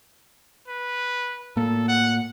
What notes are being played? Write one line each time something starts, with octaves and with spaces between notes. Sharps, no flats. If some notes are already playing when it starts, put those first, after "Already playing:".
B4
A2 A#3 A4
F#5